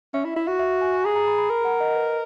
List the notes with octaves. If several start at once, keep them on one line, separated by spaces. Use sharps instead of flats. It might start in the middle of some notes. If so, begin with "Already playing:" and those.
C#4 E5
E4
E4
F#4
E5
G#5
G#4 A#5
A#5
B5
B5
A#4 A#5
F#5
D#5
B4